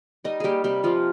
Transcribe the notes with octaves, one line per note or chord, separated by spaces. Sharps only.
G3 D#4 D#5
G3 A#3 G4 G#4
C3 G3 G4
C3 F3 F4